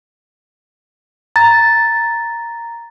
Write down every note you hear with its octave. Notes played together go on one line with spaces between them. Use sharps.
A#5 A6